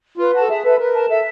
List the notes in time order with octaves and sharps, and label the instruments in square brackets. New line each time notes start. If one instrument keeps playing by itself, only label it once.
[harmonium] F4 [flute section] B4
[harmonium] F#4 [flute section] A5
[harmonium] A4
[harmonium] G#4 [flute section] E5
[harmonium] A4 [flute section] B4
[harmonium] A#4 [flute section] B4
[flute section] A5
[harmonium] A4 [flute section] E5